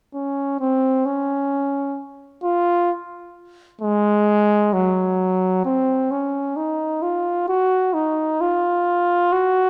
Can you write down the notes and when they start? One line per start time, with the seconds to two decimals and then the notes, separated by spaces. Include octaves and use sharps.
0.14 C#4
0.60 C4
1.06 C#4
2.43 F4
3.81 G#3
4.73 F#3
5.65 C4
6.11 C#4
6.57 D#4
7.02 F4
7.48 F#4
7.94 D#4
8.41 F4
9.32 F#4